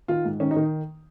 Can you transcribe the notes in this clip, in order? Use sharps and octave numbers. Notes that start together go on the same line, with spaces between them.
D#3 F4
G#2
D#3 C#4
D#4
D#3